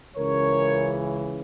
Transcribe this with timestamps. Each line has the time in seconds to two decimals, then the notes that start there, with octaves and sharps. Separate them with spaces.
0.16 C#2 C#3 E3 A#4 C#5